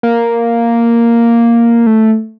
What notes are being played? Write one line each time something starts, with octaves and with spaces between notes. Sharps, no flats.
A#3
A3